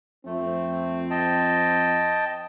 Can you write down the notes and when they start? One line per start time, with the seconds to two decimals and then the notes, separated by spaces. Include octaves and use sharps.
0.26 F2 A3 C4
1.10 D#5 G5 A5